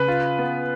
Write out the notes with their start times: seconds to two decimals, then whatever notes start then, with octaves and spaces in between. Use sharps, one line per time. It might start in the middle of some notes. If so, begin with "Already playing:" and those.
Already playing: C#3 B4
0.08 F4
0.39 B3